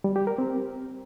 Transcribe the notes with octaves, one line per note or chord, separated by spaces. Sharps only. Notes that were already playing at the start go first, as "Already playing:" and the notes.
G3
G4
A#4
C4